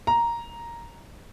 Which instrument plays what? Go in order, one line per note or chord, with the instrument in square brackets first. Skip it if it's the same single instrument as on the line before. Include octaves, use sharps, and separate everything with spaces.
[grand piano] A#5